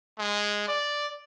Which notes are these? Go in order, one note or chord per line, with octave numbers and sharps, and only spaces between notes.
G#3
D5